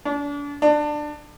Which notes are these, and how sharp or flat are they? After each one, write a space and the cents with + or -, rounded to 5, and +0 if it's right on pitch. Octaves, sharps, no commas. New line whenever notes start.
D4 -35
D4 +20